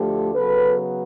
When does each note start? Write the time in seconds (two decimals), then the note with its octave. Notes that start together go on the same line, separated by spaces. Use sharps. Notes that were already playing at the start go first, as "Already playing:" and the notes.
Already playing: D2 D3 F3 A3 G4 A4
0.34 C#3 F#3 B3 A4 B4